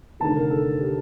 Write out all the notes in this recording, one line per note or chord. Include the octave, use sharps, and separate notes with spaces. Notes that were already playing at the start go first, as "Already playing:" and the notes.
F1 D#2 D3 A5
A#4
A4
G4